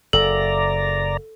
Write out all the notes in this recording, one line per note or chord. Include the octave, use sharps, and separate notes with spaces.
F#1 A4 D5 A#5